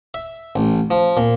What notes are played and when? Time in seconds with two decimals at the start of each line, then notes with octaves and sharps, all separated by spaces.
0.14 E5
0.56 A1
0.91 F3
1.17 A#2